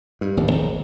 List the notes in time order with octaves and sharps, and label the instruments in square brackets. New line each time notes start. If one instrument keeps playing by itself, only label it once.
[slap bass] G2
D1 D#2
G#1